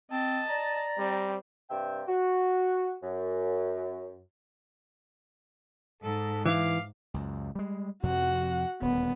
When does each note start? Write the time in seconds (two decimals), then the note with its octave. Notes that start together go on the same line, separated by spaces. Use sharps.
0.11 C4 D#5 A5
0.49 D5 A#5
0.98 G3 C4
1.70 G2 C3 E5 G5
2.08 F#4
3.03 F#2
6.02 G#2 A4
6.46 E3 F5 D6
7.14 C#2 F#2
7.55 G3 G#3
8.03 F2 C3 F3 F#4 F#5
8.82 D#1 D2 B3